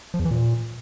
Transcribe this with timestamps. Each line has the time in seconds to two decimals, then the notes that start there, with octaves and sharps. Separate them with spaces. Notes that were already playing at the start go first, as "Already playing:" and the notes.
0.14 F3
0.20 E2
0.25 E3
0.31 A#2